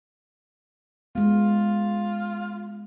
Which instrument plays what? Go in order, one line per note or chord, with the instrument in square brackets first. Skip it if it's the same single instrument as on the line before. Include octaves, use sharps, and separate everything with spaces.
[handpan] G#3 B3 [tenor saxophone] F4